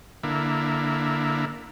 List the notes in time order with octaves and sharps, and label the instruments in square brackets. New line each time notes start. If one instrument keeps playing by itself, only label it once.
[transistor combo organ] D3 A#3 E4